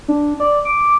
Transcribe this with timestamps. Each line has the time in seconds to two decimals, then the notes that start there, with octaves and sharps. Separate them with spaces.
0.08 D4
0.40 D5
0.65 D6